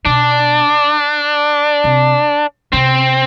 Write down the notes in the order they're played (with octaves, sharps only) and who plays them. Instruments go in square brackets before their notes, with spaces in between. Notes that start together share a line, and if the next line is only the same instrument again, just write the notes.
[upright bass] B2 [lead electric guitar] D4
[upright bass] C3
[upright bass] C3 [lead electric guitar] C4